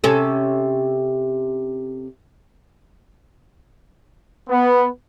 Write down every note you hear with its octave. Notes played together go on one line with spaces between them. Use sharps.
C3 C#4 A4
B3